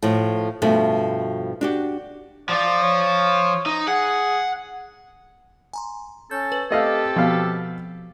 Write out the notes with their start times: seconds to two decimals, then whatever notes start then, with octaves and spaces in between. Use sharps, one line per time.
0.03 A2 F3
0.62 G2 B2 F3 A3
1.61 D4 F#4 G4
2.49 F3 F4 D5
2.83 C#5
3.66 D#4
3.88 G#4 F#5
5.73 G#5 A#5 C6
6.31 C#4 A4 G6
6.52 B4 F#7
6.70 A3 C4 G4 A4 D#5 F5
7.16 B2 F3 F5